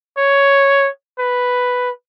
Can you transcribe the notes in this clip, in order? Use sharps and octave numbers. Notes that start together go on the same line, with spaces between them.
C#5
B4